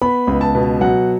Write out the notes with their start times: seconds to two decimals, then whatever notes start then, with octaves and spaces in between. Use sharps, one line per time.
0.02 B3 B5
0.27 C#2
0.41 A5
0.55 B2
0.81 F#3 F#5